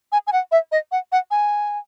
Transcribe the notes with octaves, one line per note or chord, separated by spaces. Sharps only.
G#5
G#5
F#5
E5
D#5
F#5
F#5
G#5